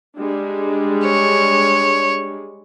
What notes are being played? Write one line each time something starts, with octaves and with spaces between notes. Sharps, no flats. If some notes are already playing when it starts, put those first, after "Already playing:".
G3 G#3 D4
C#5